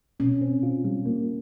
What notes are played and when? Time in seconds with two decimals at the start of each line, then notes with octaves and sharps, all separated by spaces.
0.19 B2 C#4
0.41 C4
0.63 F4
0.85 G3
1.06 A#3